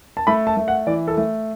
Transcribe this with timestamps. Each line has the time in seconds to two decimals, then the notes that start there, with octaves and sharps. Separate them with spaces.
0.17 A5
0.27 A3 B5
0.47 A5
0.57 A3
0.68 F#5
0.87 E3 D5
1.08 A4
1.17 A3